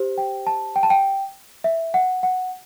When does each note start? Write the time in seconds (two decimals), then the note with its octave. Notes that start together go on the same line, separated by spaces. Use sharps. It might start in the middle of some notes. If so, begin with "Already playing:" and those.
Already playing: G4 C5
0.18 G5
0.47 A5
0.76 G5
0.83 A5
0.90 G5
1.64 E5
1.94 F#5
2.23 F#5